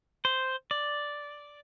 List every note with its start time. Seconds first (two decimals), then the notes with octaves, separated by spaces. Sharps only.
0.25 C5
0.71 D5